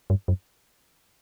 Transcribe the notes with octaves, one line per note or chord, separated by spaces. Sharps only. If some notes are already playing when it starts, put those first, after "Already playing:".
G2
F#2